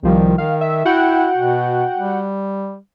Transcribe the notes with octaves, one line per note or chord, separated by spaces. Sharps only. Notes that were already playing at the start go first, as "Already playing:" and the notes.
C2 D#3 F3 G3
D#3 F5
E5
E4 F#4 F#5 G5
B2
G3